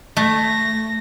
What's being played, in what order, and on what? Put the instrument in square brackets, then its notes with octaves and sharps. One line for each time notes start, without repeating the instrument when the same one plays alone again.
[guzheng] A3 [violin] A#6